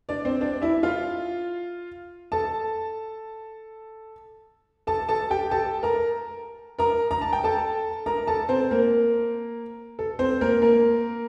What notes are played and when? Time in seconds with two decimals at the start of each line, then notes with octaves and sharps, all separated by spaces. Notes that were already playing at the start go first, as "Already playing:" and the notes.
0.09 D4 D5
0.25 C4 C5
0.41 D4 D5
0.62 E4 E5
0.83 F4 F5
2.32 A4 A5
4.87 A4 A5
5.09 A4 A5
5.30 G4 G5
5.51 A4 A5
5.83 A#4 A#5
6.79 A#4 A#5
7.11 A#5
7.21 A5
7.33 G5
7.44 A4 A5
8.06 A#4 A#5
8.27 A4 A5
8.49 C4 C5
8.71 A#3 A#4
9.99 A4
10.19 C4 C5
10.41 A#3 A#4
10.62 A#3 A#4